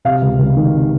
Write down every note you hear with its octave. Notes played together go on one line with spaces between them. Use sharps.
C3 F5
C#2
C#2
D#3
C3